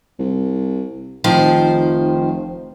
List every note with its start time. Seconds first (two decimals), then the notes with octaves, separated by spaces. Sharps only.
0.19 C2
1.24 F1 D#3 F3 C5